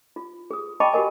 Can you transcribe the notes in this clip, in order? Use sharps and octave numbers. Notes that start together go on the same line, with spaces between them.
F4
G#4 D#6
D#5 G5 A5 B5 C#6 D6
F#4 G4 A#4 D#5 G#5